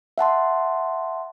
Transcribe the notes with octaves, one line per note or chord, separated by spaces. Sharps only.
E5 F#5 A5 C6